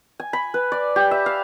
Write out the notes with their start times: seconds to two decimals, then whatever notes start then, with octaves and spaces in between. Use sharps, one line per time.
0.20 G#5
0.33 B5
0.54 B4
0.72 D5
0.96 G4
1.11 E5
1.26 F5